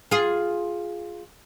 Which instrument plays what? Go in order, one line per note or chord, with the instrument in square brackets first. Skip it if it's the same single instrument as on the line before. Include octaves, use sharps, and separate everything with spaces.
[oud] F4 G#4